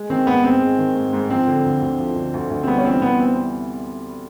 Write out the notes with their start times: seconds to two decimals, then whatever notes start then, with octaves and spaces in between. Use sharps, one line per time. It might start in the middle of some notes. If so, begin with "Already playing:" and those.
Already playing: G#3
0.10 D#3 C4
0.27 G#2 B3
0.44 G#2 C4
0.62 G#3
0.79 D#3
0.95 G#2
1.13 G#2
1.30 F3 C4
1.47 D3
1.65 D2
1.81 D2
1.98 F3
2.16 D3
2.34 D2
2.50 D2
2.63 C4
2.68 G3 B3
2.78 C#4
2.85 E3 C4
3.02 C3 B3
3.19 B3 C4